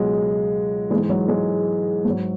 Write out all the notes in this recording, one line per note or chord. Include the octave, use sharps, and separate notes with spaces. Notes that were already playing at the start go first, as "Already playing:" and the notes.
Already playing: C#2 B2 F#3 G#3
E3 G#3
G#2
F#3
G#3
G#2 F#3